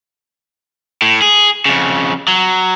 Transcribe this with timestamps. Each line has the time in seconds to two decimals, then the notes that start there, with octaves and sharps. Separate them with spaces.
1.02 A2
1.22 G#4
1.66 F2 C#3
2.28 F#3